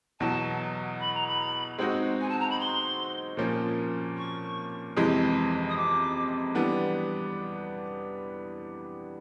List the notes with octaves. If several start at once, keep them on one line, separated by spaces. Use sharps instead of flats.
E2 B2 F#3 A5
B5
A#5
B5
G#3 C4 D#4 F#4
G#5
A5
A#5
B5
C6
A#2 F3 A#3 C#4
C#6
F2 C3 E3 G#3
D#6
D6
E3 G3 B3 D4